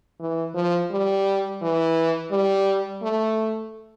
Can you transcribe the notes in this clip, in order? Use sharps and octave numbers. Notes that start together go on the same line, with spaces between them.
E3
F3
G3
E3
G3
A3